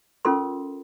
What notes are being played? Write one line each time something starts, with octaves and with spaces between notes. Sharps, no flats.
C#4 F4 A4 A#4 C6